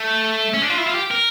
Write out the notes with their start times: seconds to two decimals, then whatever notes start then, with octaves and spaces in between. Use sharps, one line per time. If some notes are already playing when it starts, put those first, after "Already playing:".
Already playing: A3
0.54 C#4
0.62 D4
0.70 F4
0.78 E4
0.86 F4
0.94 G4
1.11 A#4